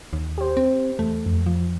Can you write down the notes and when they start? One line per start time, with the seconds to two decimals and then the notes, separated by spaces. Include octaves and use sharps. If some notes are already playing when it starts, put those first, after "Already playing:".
0.13 D#2
0.38 G4 C5
0.57 C4
0.99 E2 A3
1.26 F2
1.46 F3